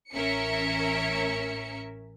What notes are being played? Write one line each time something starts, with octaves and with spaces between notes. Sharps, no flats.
A1 C#4 A#4 E5 C#7